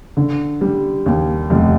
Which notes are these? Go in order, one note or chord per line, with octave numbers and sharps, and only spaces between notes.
D3
G3
D#2
F1